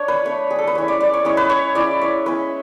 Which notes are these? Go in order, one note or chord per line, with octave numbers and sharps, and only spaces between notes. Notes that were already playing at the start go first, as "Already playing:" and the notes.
Already playing: D4 C#5
B4
A3 D4 C#5
G#4
A4
B4
G#3 C#4 E4 C#5
D5
D5
C#5
G#3 C#4 E4 C#5
B4
C#5
G#3 C#4 E4 D5
C#5
G#3 C#4 E4 B4